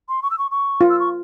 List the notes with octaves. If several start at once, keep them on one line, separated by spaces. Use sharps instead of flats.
C6
C#6
E6
C#6
C#6
F4
E6
C#6